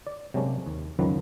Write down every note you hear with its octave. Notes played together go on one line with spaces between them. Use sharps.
D5
C3 F#3 G#3 A#3 C#4 D4
D#2
C#2 F#2 D#3 F3 F#3 B4